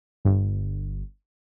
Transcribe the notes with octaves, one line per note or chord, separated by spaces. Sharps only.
G1